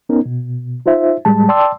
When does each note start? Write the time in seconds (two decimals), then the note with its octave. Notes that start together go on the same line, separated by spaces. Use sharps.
0.09 B3 C#4 D#4 A#4
0.26 B2
0.86 D#4 F4 C5 E5
1.25 A2 G3 G#3 A5
1.49 D5 G5 A5 C6 D6 E6